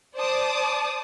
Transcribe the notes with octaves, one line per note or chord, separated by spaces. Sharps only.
C5 D5 A5 D6 D#6